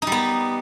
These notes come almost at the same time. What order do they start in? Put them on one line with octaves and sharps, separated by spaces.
D#4 G3 B3